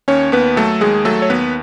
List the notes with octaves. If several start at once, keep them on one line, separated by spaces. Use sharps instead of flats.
D#2 C#4 C#5
D#2 B3 B4
F#3 A3 A4
D#2 G#3 G#4
F#3 A3 A4
C#5
D#2 B3 B4